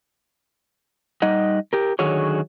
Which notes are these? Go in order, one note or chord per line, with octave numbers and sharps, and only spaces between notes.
G3 D#4 D#5 F#5
G4 A#4
D3 D#3 F#3 F#4 G#4 C#5